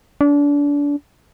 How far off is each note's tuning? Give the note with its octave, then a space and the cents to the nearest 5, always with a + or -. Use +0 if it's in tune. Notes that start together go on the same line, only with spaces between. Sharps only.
D4 -30